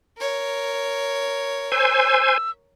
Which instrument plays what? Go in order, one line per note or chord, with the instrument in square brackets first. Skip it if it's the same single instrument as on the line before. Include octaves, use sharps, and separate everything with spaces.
[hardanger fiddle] A#4 C#5
[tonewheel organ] C5 G#5 [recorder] E6